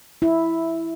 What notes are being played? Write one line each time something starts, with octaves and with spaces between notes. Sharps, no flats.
E4